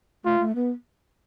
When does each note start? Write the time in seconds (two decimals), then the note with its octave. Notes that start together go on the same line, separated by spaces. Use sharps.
0.24 A3 F4
0.40 A3
0.55 B3